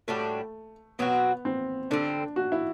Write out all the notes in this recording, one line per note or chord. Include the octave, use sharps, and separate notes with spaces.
A2 G3 A3 D4 F#4
B2 F#3 B3 C4 F#4
C4
D3 G3 C4 D4
F#4
E4